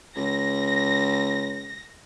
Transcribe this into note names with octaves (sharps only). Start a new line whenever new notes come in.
C#2 A#6